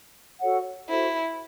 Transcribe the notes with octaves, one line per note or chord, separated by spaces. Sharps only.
F#4 A4 C#5 F#5
E4 F#4 A4 C5